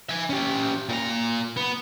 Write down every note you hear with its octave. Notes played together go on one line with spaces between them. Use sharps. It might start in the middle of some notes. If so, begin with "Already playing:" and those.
E5 G#5
C#4 G4
A#2 A#5
B3